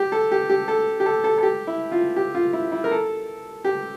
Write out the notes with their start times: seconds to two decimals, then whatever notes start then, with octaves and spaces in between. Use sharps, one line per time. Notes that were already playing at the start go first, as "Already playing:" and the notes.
Already playing: G4
0.12 A4
0.31 G4
0.49 G4
0.68 A4
1.00 G4
1.06 A4
1.24 A4
1.38 A4
1.43 G4
1.67 E4
1.92 F4
2.16 G4
2.35 F4
2.53 E4
2.72 E4
2.84 A#4
2.91 A4
3.65 G4